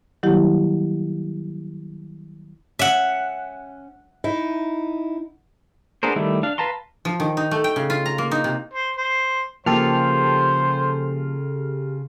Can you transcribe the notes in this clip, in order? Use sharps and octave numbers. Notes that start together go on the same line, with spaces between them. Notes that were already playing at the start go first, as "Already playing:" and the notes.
D#3 F#3 G3 A#3 E4 G4
C#4 E5 F#5
D#4 E4
B3 D4 G#4 A#4 C5
D#3 G3 A3 E4
D4 F5
B4 F5 A5 A#5 C6
F3
D#3
D#4
A3
G5
C#3
F4
A#5
A#3
D#4
C3
C5
C5
C#3 F3 A#3 F4 G4 A4 C5 F6